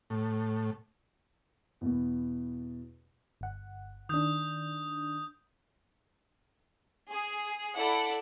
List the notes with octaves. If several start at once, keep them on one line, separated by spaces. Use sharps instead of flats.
A2
E2 B2
G1 F#5
D#3 D4 D#6 G6
G#4
E4 A4 D5 F#5